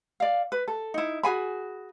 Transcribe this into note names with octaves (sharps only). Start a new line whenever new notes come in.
D5 F5
B4
A4
D#4 E4
F#4 G#4 G#5 B5